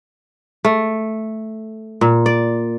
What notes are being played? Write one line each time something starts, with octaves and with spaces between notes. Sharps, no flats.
A3
A#2
D5